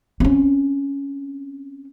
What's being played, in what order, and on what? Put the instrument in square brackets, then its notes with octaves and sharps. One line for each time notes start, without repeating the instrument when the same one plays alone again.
[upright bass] C4 C#4